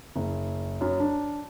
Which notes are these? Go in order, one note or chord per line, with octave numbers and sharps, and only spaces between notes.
F#1
F#2
D4